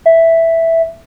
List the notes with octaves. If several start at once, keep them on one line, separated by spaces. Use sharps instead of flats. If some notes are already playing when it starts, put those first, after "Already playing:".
E5